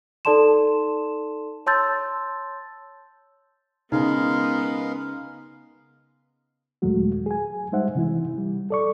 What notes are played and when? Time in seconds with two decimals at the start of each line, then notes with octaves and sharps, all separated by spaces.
0.25 D#4 A4 D5 A5 C6 E7
1.66 C#5 A5 C6 E6 G6 A6
3.92 C#3 G#3 B3 D#4 A#4 F5
6.82 D#2 A#2 F#3 G#3 A3 F#4
7.26 G#4 G#5
7.72 G3 G#3 D#4 C5 E5 F#5
7.95 C3 E3 E4
8.38 G3
8.70 A4 D5 C#6